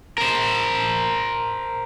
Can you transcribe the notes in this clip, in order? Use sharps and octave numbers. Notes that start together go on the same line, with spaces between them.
A#4 C5